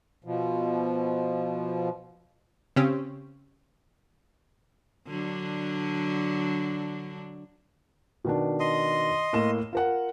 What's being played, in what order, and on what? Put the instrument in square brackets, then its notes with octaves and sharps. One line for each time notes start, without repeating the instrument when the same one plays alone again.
[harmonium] B2 F3
[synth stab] C#3 C4 C#4 G4
[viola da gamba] D3 F#3 D4
[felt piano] B2 D#3 D4
[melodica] D#5 C6 D#6
[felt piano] A2 A#3 E7
F4 A#4 F#5